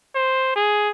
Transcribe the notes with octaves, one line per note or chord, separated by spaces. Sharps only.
C5
G#4